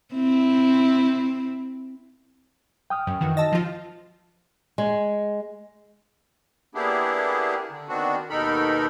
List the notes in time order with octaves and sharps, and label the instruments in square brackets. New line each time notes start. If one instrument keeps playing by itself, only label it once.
[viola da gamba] C4 E4
[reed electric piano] G5 D#6 F6
[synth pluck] F#2
D#3 E3 F#4
[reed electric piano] D#5 A5 [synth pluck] E6 A6 A#6
[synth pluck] F3 F4
[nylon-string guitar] G#3
[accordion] A#3 B3 D4 E4 G4 G#4
D3
D#3 B3 C4 D4 F#4
D#2 B2 D#4 A4 A#4 B5